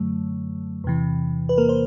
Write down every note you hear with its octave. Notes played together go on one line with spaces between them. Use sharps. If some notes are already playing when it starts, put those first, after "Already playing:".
Already playing: F#2 D3 F#3 A3
E2 C3 E3
B4
A#3 A#4
C5